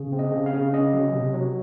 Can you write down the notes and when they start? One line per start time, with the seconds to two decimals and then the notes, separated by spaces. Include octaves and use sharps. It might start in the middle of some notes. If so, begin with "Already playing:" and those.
Already playing: C#3
0.12 C4
0.19 D#5
0.32 C#3
0.46 F5
0.53 C#3
0.73 C#4 D#5
0.93 F#3
1.14 C3
1.34 F#3